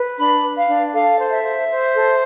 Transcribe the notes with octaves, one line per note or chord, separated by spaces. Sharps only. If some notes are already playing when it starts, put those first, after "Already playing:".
Already playing: B4
D4 B5
B4
F5
D4
A4 F5
C5
E5
C5
C5
A4